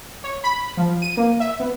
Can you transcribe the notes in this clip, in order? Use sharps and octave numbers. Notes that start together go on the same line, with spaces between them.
C#5
B5
F3
D#7
A#3
E5
B3